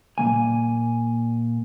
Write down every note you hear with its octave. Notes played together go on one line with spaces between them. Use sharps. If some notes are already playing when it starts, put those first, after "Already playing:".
A#2 E3 A#3 G#5